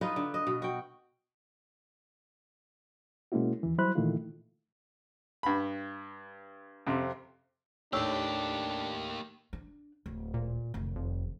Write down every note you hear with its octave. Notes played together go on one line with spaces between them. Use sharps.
D#4 F4 B4 D#5
D3
D#5
B2
F#4 G5
B2 G#3 A#3 C#4 E4 F#4
D#2 E3
F#3 G3 E4 C5 B5 F#6
A#2 D#3 E3 A3 E4 F4
G2 B5
F2 C3
D#2 A2 A#3 D4 G4 C#5 C#6 E6
D4
D1
A#2
F1 D#3
F2